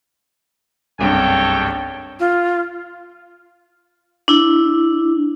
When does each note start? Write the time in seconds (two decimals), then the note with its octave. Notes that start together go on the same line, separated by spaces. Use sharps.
0.99 F#1 C2 G2 A4 C#5 G5
2.20 F4
4.28 D4 E4